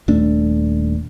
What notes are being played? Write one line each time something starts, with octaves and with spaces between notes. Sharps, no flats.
D#1 A3 D4